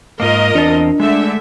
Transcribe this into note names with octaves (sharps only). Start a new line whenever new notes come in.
G#2 A#3 F4 A#4 D#5
E2 C4 D4 A5
D3 G#3 A3 E5